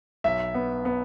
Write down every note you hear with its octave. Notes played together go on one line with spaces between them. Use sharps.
B1 E5
B3
B3